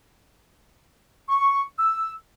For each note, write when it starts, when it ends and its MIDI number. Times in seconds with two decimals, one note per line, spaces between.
1.29 1.61 85
1.79 2.12 88